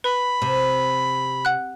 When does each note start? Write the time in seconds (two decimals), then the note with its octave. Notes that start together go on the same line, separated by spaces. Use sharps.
0.04 B4 B5
0.42 C3
1.45 F#5 F#6